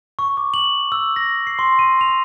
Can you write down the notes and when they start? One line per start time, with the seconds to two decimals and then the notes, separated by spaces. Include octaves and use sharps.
0.19 C#6
0.37 D6
0.54 F#7
0.92 E6
1.16 A#6
1.47 C7
1.59 C6
1.79 D#7
2.01 F7